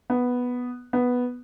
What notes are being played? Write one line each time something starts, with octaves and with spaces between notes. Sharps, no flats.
B3
B3